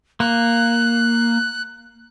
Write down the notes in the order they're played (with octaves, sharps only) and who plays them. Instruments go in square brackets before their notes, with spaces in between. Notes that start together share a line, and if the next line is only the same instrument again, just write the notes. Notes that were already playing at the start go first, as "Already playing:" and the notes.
[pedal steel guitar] A#3 [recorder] F#6